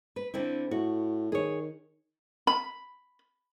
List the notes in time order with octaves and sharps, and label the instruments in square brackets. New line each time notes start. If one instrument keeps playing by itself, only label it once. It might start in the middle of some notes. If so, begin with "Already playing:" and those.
[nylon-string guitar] B4
D3 C4 E4
[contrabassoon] A2 [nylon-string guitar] F#4
[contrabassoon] D#3 [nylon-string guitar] G#4 C#5
[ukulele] B5